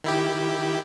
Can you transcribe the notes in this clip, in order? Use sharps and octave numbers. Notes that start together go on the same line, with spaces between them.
D#3 E4 G4